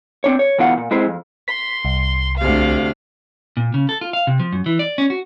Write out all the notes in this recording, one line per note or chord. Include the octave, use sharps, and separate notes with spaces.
C4 D4 C#5
C#5
D2 B2 E3 F4 F#5
A#2
G#3 C4 E4 G#4 C5
F2
C6 B6
C2
D2 C3 F5
A#2
C#3
A4
F4
F5
C3
F3
F#2
E3
D5
C#4
F#4